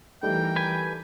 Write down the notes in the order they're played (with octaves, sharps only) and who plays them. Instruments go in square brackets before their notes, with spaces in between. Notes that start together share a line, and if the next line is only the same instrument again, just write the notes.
[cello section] E3 A#4 [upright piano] G3 A3 D#4 [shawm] G5
[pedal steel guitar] B4 G#5